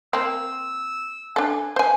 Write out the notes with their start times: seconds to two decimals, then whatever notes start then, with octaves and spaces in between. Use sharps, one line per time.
0.13 A#3 C4 E6
1.36 D4 A4 G#5
1.76 B4 C5 G#5